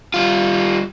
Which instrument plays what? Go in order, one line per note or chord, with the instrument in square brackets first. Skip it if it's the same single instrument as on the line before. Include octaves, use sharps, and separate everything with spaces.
[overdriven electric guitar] G3 F4